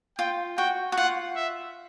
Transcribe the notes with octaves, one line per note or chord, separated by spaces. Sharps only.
F4 G5
F#4 G5
F#4
F4 F#5
E5